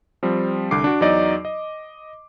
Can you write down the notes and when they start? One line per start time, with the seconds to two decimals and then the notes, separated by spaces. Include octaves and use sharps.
0.23 F3 G3 C4
0.71 C2 D3 D6 C7
0.84 D4 F#4
1.01 E2 F#3 D#4 D5 D#5
1.45 D#5